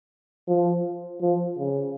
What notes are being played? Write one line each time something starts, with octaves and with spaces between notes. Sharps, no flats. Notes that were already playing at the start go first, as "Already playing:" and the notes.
F3
F3
C#3